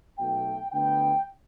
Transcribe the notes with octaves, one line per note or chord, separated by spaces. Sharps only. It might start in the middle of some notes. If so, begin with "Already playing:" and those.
B1 B2 A3 G5
D2 D3 B3 G5